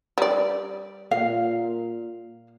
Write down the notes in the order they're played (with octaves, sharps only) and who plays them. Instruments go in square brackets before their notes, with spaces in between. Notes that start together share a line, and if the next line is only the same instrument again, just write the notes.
[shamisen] G3 D5
[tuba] A#2 [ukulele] F5